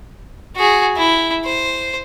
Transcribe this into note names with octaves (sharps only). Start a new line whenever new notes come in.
F#4 G#4
E4
C5